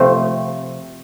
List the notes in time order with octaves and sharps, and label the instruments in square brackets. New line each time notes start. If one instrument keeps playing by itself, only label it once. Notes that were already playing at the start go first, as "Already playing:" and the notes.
Already playing: [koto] C3 F3 A3